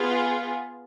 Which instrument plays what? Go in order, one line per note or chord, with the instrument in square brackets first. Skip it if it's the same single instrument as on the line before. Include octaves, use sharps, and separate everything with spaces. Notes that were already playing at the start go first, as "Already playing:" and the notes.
Already playing: [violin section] B3 F4 G#4